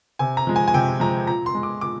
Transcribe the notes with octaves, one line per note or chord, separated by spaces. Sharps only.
C3 G#5
A#5
F3 G#3
G#5
G#5
C3 G5
F3 G#3 A#5
A#2 A#5
C6
G#3
D6
A#2 D6